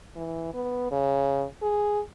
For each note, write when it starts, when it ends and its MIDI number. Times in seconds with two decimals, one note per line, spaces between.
0.16 0.51 52
0.54 0.89 59
0.91 1.45 49
1.62 2.00 68